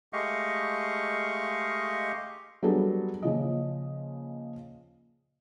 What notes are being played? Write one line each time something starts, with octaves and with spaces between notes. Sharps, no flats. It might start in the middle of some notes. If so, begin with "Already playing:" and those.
G#3 A3 G4 D#5 F5 C#6
F#3 G3 B3 D4 G#4 A4
A#2 C#3 F3 D#5